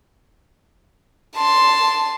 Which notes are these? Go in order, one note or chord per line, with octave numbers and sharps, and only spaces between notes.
A5 C6